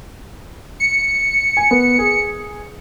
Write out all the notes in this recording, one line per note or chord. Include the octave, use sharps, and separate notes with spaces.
C#7
G#5
B3
G#4